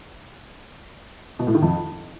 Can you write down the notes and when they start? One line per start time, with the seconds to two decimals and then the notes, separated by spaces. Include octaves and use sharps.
1.39 B2
1.47 A2
1.55 D#3
1.62 F2